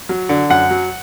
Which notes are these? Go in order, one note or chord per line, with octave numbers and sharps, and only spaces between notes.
F#3
D3
F#2 F#5
F#3